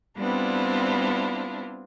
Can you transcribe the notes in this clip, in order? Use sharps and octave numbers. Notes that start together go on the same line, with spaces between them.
G3 B3 C4 D4 E4 F4